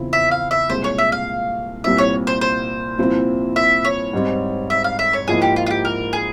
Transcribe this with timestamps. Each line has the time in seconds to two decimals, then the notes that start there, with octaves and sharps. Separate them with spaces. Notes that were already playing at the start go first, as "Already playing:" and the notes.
Already playing: E2 C#3 F3 C4 E4
0.13 E5
0.31 F5
0.51 E5
0.70 C2 A#2 G#3 C5
0.84 C#5
0.98 E5
1.12 F5
1.84 C2 A#2 G3 C4 E4 E5
1.98 C#5
2.27 C5
2.41 C5
2.98 C2 A#2 F3 C4 E4
3.56 E5
3.85 C#5
4.13 G#2 G3 C4
4.70 E5
4.84 F5
4.99 E5
5.13 C#5
5.27 G#2 F3 A#3 E4 G#4
5.42 G4
5.56 F4
5.66 F4
5.71 G4
5.85 A#4
6.13 G#4